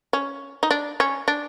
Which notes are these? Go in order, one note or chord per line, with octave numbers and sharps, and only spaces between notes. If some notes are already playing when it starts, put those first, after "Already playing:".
C#4
D#4
D4
C#4
D4